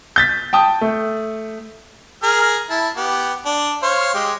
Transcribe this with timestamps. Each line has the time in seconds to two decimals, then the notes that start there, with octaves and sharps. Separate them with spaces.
0.16 G6 A6 B6
0.53 G5 A5 D#6
0.81 A3
2.23 G#4 A#4 F6
2.70 E4 A5
2.97 B3 G4
3.45 D4
3.83 C5 C#5 F5
4.14 G#3 G4